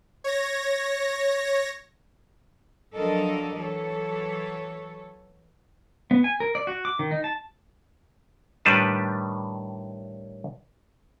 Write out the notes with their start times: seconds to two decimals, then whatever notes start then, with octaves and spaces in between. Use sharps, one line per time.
0.24 C#5 A#6
2.94 F3 F#3 D4 A4 A#4 D#5
3.57 E3 F#3 A4 C#5
6.11 B3
6.24 G#5
6.40 A#4
6.55 D5
6.67 F#4
6.85 D6
6.99 D#3
7.11 D#4
7.24 A5
8.65 A2 D#3 G3 D4 B4 A5